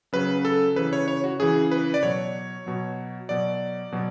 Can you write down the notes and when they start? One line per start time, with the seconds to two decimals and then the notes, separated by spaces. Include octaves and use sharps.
0.13 C#3 F#3 B4
0.45 A4
0.76 C#3 E3 B4
0.93 C#5
1.08 C#5
1.24 F#4
1.40 C#3 E3 G#4
1.71 B4
1.94 D5
2.03 B2 F#3 C#5
2.66 B2 F#3
3.29 B2 F#3 D5
3.92 B2 F#3